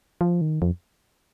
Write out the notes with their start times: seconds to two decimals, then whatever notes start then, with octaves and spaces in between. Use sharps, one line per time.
0.21 F3
0.41 D#3
0.62 F2